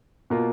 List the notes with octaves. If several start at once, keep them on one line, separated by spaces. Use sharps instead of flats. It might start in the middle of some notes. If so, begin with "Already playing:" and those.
B2 A#3 F4